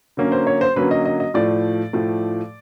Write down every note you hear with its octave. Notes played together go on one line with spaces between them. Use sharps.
D3 F#3 A#3 C#4
C5
C#5
C5
D3 F#3 A#3 C#4 B4
D#5
D#5
D#5
A2 F3 A3 D5
A2 F3 A3